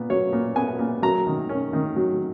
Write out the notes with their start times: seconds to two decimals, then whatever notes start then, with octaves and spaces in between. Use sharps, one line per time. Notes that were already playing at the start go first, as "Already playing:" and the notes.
Already playing: A#2 B3
0.10 F#3 C#5
0.33 A#2
0.56 B3 G#5
0.79 A#2
1.02 F#3 A#5
1.27 D#3
1.49 C#4
1.73 D#3
1.96 F#3